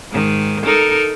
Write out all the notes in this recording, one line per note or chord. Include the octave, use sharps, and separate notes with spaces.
G#2 D#3
D#4 A4 A#4